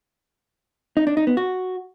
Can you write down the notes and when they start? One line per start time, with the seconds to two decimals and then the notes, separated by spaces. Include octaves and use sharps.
0.97 D#4
1.07 D4
1.17 D#4
1.27 B3
1.37 F#4